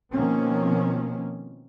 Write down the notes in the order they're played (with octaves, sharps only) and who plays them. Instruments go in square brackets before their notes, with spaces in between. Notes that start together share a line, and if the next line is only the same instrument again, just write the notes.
[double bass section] B2 D#3 F3 A#3 C4 C#4